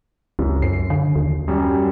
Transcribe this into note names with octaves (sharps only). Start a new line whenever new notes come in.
C#2 F#2
F#2 C7
D3
D#2
F#2 G3 C#4